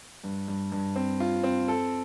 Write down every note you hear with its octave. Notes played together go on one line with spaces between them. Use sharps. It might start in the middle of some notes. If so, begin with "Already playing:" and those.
G2
G2
G2
C4
F4
C4
A4